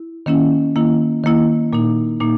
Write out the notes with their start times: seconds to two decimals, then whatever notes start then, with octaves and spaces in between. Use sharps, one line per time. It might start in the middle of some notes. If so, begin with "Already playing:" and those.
Already playing: E4
0.26 D#3 A#3 C#4 E4
0.76 D#3 A#3 E4
1.24 D#3 A#3 E4
1.73 A#2 A#3 D#4
2.20 A#2 A#3 D#4